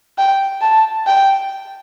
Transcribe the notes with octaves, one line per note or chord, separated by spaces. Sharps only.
G5
A5
G5